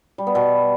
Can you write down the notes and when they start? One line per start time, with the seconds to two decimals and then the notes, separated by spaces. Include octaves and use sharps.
0.18 G3
0.27 B3
0.35 B2